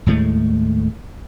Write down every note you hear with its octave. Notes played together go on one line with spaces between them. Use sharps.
D#2 A2 G#3 A3